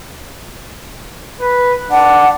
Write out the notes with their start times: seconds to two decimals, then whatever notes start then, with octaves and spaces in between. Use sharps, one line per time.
1.41 B4
1.91 D4 F#5